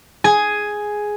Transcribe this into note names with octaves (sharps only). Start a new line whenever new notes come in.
G#4 G#5